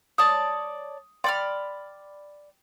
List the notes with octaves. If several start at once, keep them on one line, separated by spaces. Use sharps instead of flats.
C#5 D5 A5 D#6
D5 G5 B5 C6 F6